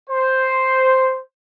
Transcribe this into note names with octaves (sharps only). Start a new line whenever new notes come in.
C5